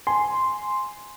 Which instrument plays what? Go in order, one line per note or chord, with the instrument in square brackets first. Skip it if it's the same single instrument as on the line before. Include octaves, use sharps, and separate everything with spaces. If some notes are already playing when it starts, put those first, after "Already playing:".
[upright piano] G#5 [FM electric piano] C6